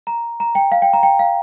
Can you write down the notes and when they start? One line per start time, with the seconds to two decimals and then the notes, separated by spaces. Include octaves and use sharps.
0.07 A#5
0.40 A#5
0.55 G5
0.72 F5
0.82 G5
0.93 A#5
1.03 G5
1.19 F5